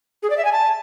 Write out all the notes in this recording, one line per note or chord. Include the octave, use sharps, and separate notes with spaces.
G#4
D5
E5
G#5
A5